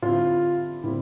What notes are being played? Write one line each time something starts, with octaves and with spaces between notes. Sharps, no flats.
D3 G3 C4 E4 F4
D3 G3 C4 E4